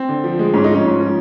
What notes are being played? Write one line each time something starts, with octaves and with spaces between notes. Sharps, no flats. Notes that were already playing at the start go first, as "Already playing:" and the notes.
Already playing: C4
D3
F3
G#3
G#2 C#4
D#4
F3
C#4
G#2
F3